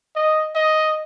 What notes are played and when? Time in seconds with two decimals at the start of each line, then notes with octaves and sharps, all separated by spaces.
0.15 D#5
0.55 D#5